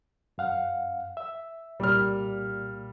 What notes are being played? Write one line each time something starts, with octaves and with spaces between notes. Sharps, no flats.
F#2 F5 F#5
E5
C2 A#2 G3 A#3 F6